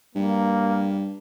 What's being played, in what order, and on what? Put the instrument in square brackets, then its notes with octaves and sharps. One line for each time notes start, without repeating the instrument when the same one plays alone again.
[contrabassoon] G2 [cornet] A#3